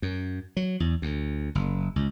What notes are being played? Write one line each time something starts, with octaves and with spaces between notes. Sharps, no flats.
F#2
F#3
E2
D2
F#1
C#2